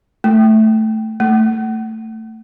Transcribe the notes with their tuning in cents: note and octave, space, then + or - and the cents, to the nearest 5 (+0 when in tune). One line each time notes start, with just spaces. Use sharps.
A3 -5
A3 +20